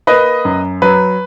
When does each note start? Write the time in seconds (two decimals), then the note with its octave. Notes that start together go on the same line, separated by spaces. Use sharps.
0.07 A#3 B4 D#5
0.45 F#2
0.82 F#3 B4